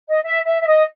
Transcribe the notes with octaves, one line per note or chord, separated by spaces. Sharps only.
D#5
E5
E5
E5
D#5